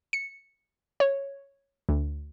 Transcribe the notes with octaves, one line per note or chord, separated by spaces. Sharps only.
C#7
C#5
D2